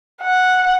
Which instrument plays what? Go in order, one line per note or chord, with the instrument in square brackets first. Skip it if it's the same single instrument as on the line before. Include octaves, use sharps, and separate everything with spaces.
[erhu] F#5